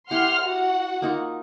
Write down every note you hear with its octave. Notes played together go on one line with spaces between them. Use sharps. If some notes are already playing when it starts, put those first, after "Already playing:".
E4 G4 F#5 C6 F6
F#4 F#5
A#3 D#4 F4